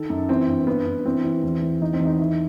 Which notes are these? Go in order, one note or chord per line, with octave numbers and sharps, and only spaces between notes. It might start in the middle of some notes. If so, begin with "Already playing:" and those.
Already playing: D#3 A4
F#2
E3 C4
G2
G2 B3
G2
E3 C4
E3
E2
E3
E2 D#4
C4
E2
D#4
D#3 E4